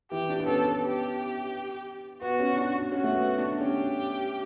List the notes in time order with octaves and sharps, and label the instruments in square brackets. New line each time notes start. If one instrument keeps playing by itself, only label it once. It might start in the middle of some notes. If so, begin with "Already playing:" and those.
[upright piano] E3 [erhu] G4
[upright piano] D4
B3
[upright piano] C#4 [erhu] A4
[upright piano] B3
[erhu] G4
[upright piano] B3 [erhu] F#4
[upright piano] C#4
D4
D4
[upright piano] C#4 [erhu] F#4
[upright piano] A3
B3
D4
D4
[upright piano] C#4 [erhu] G4